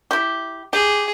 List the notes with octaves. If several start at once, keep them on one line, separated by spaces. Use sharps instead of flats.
E4 G4
G4 G#4